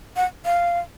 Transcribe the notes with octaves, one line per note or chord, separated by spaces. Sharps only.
F#5
F5